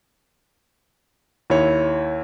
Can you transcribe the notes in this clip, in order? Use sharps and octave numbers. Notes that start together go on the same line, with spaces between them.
D#2 E4 C#5